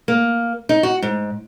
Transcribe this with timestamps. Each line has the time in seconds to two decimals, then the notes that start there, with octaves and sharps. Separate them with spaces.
0.08 A#3
0.69 D#4
0.83 F#4
1.02 G#2